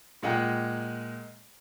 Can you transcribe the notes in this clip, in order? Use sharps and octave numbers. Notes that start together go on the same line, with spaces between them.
A#2 G#3 F#5 G5